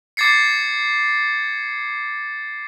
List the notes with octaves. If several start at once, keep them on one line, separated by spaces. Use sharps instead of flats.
D6 G#6 A6 C7 C#7